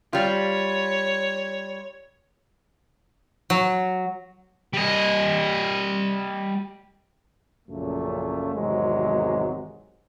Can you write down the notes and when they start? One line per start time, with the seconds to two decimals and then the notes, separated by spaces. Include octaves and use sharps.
0.13 G3 F4 C#5
3.50 F#3
4.73 G3 D#5
7.68 A#1 F#2 A#2 C#3 A3
8.55 G#1 E2 C3 F#3 G#3